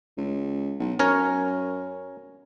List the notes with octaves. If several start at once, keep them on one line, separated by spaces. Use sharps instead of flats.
C#2
B1
F#2 C#4 A#4 C#5